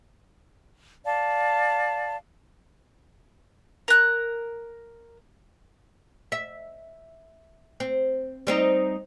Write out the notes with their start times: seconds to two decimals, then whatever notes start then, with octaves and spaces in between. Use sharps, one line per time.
1.04 D5 F5 A5
3.88 A#4 F#6
6.32 E5
7.80 C4
8.47 G3 C4 D#4